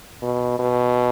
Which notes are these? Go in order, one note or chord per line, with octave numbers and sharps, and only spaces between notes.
B2
B2